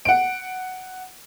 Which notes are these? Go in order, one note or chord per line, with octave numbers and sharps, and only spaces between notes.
F#5 D7